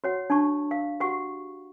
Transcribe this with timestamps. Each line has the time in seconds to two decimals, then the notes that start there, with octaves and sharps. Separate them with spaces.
0.04 F#4 C#5 F#5
0.30 D4 A5 C#6
0.71 F5
1.00 F#4 G4 F#5 C#6